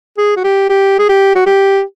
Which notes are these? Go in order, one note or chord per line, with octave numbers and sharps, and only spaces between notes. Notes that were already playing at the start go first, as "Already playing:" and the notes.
G#4
F#4
G4
G4
G#4
G4
F#4
G4